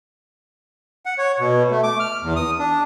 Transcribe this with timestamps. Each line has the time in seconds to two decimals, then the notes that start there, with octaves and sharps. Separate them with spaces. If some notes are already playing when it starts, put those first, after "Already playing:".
1.06 F#5
1.18 C#5
1.40 B2
1.71 A3
1.83 D6
2.00 F6
2.22 E2
2.36 D#6
2.59 D4